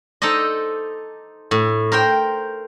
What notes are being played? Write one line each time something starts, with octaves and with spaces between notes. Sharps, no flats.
D#4 A4 C5 D5 D#5
A2
A#4 C5 G5